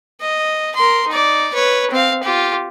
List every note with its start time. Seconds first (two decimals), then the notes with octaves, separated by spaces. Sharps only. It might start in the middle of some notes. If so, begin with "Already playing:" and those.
0.21 D#5
0.75 A#4 C6
1.08 D#4 D5
1.54 B4 C#5
1.91 C4 F5
2.23 F4 G4